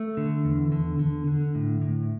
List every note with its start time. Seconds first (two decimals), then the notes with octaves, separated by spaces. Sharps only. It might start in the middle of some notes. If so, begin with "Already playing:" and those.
Already playing: A3
0.17 D3
0.45 E2
0.72 D3
0.99 D3
1.27 D3
1.55 A2
1.82 A2